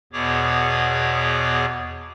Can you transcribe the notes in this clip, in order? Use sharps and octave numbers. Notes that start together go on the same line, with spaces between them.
E2 B2 B3 G#4 C#5 D6